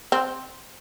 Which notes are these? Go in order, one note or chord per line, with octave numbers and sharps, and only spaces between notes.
C4